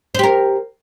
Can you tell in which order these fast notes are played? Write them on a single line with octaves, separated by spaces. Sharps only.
C5 G4 A#4